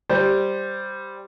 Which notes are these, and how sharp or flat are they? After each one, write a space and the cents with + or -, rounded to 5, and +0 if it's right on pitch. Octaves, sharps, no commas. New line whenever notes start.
G3 +0 C5 +0